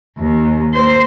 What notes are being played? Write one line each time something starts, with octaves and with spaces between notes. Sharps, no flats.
D#2
A#3 C5